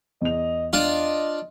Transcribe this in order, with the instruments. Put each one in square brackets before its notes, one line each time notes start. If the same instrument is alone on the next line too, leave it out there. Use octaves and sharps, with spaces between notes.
[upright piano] E2 F7 [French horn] D#5
[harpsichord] D4 F4 [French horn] D#5